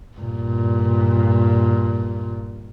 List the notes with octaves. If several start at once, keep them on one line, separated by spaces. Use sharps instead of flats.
G2 A#2